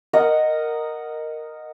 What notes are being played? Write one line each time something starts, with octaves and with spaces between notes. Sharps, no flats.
A#4 D#5 F#5